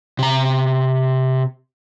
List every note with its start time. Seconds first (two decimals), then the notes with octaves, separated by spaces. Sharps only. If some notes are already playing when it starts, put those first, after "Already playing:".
0.19 C3 A#5